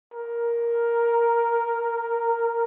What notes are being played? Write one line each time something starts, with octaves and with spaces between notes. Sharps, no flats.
A#4